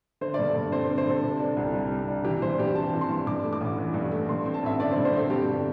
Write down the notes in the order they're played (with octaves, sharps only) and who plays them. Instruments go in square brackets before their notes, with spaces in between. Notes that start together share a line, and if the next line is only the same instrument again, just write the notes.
[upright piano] D3 C5
D5
G2
A4
G2
C4 C5
D3
C5
G2 A4
C3
D4
C2
G3
C3
D4
E3 G4
G2 C5
G2 G4
C4 A5
E3
C6
G2
G2 D6
A3
D6
A1
E3
G2
A3
G2 C6
C4
A5
A1 E5
D3 D5
C5
G2
C5
C4 A4
G2 G4
G1